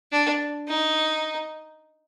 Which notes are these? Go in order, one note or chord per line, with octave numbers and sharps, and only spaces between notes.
D4
D#4